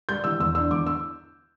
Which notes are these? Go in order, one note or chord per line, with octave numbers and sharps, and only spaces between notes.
G3 G6
E3 E6
E2 E6
D4 E6
E2 D6
E6